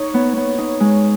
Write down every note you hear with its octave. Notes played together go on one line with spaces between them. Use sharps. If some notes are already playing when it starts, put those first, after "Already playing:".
Already playing: D#4 C#5
B3
B3
D#4
G#3